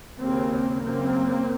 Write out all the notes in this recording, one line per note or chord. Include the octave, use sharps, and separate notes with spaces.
D#2 C#3 A#3 C4
F#2 C#3 A#3 C4